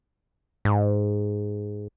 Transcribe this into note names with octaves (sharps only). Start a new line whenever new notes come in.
G#2